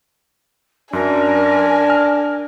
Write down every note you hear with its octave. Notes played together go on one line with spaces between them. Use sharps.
F#2 D4 A#4 G#5
F6